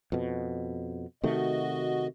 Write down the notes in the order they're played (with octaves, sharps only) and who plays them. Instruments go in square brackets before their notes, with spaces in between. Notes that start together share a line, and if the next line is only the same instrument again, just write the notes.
[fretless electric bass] F2 B2
[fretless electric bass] C3 D#3 A3 [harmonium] F#4 D#5